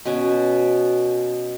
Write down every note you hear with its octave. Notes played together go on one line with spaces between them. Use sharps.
B2 C#4